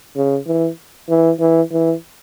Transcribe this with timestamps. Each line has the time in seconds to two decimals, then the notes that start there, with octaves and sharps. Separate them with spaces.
0.16 C#3
0.47 E3
1.09 E3
1.40 E3
1.72 E3